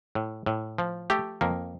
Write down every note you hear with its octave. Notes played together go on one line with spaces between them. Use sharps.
A2
A2
F3
A3 G4
F2 A#3